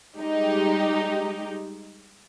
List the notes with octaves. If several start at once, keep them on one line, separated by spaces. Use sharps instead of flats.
G3 G#3 D#4 G4